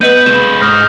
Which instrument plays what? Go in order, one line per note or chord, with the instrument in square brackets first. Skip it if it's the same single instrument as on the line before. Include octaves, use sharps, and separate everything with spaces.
[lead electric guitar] B3 [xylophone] B4 D#5 D#7 [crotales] G6 F#7
[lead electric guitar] G#3 B4 [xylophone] E7
[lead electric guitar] G#2 [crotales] D#6 F6 A#6